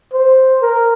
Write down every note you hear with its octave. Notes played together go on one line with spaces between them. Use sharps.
C5
A#4